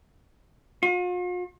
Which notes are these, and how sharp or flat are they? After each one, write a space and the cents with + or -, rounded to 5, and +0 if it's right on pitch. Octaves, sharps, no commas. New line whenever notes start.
F4 +45